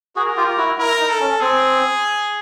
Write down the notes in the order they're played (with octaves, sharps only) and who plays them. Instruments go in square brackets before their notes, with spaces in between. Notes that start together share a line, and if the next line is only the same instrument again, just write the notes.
[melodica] F#4 G#4 [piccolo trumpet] A#4
[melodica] F4 G4
E4 F#4
[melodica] E4 [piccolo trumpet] A#4
[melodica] D#4
[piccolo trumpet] A4
[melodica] C#4
[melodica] C4 [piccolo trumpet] G#4